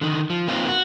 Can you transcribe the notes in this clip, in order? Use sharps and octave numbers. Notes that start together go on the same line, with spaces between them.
D3 D#3
F3
A#3 C4 D#4 F4
F#4